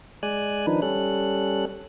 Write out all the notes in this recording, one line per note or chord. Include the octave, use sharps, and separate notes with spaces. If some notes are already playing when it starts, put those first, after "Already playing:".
G#3 D5 G#5 F#6
D#3 F3 D4 D#4 B4
G3 C#4 A4 F#6